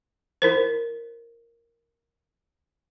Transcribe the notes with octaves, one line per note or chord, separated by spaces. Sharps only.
E4 A#4 C5